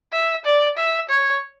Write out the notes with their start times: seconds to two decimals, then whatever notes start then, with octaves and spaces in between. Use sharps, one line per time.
0.12 E5
0.44 D5
0.77 E5
1.09 C#5